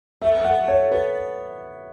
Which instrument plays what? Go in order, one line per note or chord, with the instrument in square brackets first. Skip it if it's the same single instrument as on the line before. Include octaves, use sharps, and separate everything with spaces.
[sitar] A3 [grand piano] E5
[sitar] B3
[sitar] A3 [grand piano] F#5
[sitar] B3
A3
[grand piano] C#5
[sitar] B3 [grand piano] B4